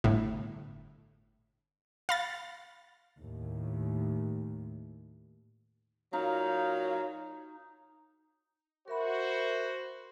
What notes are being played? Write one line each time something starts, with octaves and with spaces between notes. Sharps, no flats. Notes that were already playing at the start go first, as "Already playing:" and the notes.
G1 A2
F5 B5 A6
D#2 A2
A#2 F#3 D#4 F5 A#5
F#4 A#4 C5 E5 B5